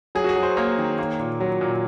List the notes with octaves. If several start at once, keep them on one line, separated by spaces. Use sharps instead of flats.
F#3 G#4
F#4
G#4
F#3
C5
A#3 C#5
D#3
A#3
A#2
F#3
A#2